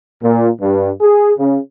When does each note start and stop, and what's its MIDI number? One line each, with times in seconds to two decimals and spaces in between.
0.22 0.49 46
0.61 0.91 43
1.01 1.33 68
1.38 1.58 49